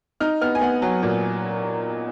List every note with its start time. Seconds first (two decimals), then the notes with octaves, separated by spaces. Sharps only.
0.20 D#4 F6
0.41 B3 F6
0.55 G#5
0.61 B3 F#5
0.82 F#3
1.03 A#2